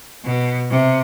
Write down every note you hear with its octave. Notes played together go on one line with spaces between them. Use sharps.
B2
C3